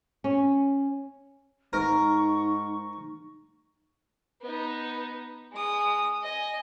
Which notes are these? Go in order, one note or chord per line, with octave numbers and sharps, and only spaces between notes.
C#4
G#2 D#4 A#4 C#6
B3 D#4
G#3 D#6
D#5 G#5